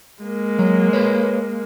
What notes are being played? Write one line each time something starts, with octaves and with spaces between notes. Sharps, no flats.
G#3 A#3
F#3
B4 C#5